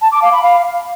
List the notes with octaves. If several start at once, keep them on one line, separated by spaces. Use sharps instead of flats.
A5
D6
F5
B5
F5